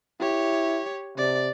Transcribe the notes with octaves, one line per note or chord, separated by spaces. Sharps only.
E4 G4 C#5
C3 D5